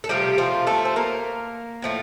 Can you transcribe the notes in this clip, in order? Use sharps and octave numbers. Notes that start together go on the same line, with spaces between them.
A4
C3 F3 G3 A3 G4
F3 F4
A3 A4
C5
A#3 A#4
A2 F3 A3